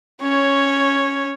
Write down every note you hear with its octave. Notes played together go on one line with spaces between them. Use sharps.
C#4 C#5